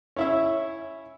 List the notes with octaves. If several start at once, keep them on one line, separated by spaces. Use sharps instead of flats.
C#4 E4 E5